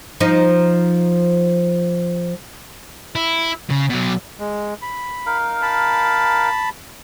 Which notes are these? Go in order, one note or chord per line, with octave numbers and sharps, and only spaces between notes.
F3 D#4
E4
C#3
B2 F#3
G#3
B5
D#4 A#4 F5
A5 B5